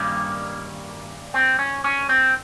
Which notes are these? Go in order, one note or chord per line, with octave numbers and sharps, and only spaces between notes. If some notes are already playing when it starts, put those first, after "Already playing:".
Already playing: G2 D#3 G3 A#3 C#4
C4
C#4
C#4
C4